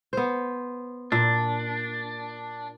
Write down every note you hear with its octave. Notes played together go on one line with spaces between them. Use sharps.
B3 C5
A#2 D4